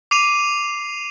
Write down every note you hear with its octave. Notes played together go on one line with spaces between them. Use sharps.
D6 C7 D#7 F7